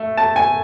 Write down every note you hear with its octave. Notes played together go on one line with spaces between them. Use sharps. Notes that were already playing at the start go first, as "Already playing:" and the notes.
Already playing: A3
A5
G#5